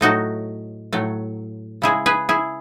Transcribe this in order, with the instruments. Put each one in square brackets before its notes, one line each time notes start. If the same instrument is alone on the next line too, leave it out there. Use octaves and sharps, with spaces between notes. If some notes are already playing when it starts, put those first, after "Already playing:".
[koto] A2 F#3 A3 D#4 F#4
A2 F#3 A3
C#3 G#3 E4 G#4
G#4 B4
E4 G#4